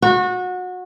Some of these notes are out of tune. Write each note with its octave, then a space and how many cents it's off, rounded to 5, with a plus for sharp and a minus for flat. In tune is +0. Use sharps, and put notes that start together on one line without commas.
F#4 -25